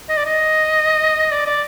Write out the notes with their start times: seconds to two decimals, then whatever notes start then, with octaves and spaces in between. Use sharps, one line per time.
0.09 D#5
0.17 D5
0.25 D#5
1.32 D5
1.46 D5